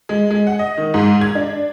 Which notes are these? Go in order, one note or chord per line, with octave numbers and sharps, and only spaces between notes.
G#3
G#3
F#5
D#5
D#3
G#2
G#6
D4